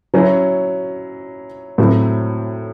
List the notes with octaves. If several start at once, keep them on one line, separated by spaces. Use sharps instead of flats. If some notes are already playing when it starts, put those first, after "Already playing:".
F#3 C#4 E4
A2 F#3 C4 E4